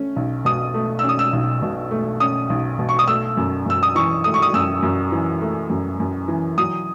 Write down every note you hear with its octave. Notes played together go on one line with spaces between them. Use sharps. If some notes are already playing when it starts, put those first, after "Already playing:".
Already playing: A3 C#4
B1
B2 D#6
A3
C#4 E6
D#6
E6
B1
B2
A3
C#4 D#6
B1
B2
C#6
D#6
A3 E6
F#2
F#2 E6
D#6
E3 C#6
A3 D#6
C#6
D#6
F#2 E6
F#2
E3
A3
F#2
F#2
E3
F#3 D#6